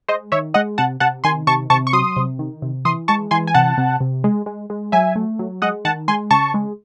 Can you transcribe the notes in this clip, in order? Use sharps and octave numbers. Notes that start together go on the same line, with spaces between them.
G#3 C5 D#5
D#3 C#5 E5
G#3 D#5 F#5
C3 F#5 A5
C3 F#5 A5
D#3 G#5 C6
C3 A5 C#6
C3 A5 C#6
C#6
F#3 C6 D#6
C3
D#3
C3
E3 C6 D#6
G#3 A5 C#6
E3 G#5 C6
G#5
C3 F#5 A5
C3
C3
G#3
G#3
G#3
F#3 E5 G#5
A3
F#3
G#3 D#5 F#5
D#3 F#5 A5
G#3 G#5 C6
C#3 A5 C#6
G#3